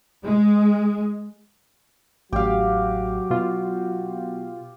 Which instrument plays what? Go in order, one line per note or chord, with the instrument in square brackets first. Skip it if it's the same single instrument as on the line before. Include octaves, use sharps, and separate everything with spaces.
[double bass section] G#3
[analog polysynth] A1 [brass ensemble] F#3 F#4 [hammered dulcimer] G4 F5
[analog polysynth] B2 F4